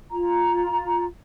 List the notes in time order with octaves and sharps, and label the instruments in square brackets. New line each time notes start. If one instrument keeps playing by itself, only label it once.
[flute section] F4 A#5